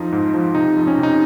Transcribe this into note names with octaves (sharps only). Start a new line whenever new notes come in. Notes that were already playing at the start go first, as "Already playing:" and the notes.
Already playing: F2 F3 D#4
G#2
F3
C3 D#4
F2
C#4
C3
D#4